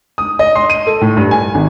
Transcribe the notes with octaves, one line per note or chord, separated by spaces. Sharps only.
D#6
D#5
C6
D#7
A4
A2
G2
G#5
G#1